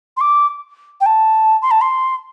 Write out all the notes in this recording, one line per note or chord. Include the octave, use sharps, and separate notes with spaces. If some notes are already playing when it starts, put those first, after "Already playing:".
C6
D6
G5
A5
C6
A5
C6